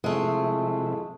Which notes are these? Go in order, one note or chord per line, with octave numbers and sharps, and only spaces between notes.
C3 F3 G#3 A3 E4